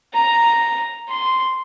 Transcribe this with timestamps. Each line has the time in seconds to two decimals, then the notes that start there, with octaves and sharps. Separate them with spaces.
0.14 A#5
1.09 C6